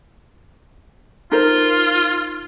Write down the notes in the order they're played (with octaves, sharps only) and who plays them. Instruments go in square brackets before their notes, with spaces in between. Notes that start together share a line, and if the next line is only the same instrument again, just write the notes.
[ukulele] D#4 A#4 C5 [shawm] F4